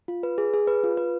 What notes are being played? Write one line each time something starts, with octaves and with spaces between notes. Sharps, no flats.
F4
B4
G#4
G#4
B4
F4
B4